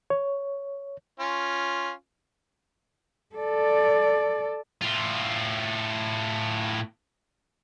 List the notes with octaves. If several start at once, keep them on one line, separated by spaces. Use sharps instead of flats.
C#5
C#4 F4
A4 D5
A2 F4